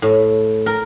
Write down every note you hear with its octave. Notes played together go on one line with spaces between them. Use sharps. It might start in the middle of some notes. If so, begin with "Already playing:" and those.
A2
A#4